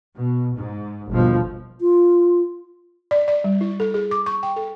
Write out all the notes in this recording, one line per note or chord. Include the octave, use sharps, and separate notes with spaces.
B2
G#2
G1 D#2 B2 F3
F4
D5
D5
G3
E4
A4
G#4
D6
C#6
G5
A4